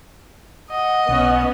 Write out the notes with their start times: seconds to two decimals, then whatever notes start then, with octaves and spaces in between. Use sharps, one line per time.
0.71 D#5 F#5
1.08 B1 B3 C#4 F#5